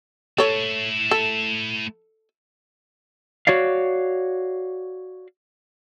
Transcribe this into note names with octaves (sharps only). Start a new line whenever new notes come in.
A3 E4 A4 C#5
A4
F#4 C#5 D5 F5